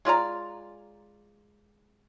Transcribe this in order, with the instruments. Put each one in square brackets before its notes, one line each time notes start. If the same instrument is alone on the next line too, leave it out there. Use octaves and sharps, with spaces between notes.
[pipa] G#3 F4 D5 A#5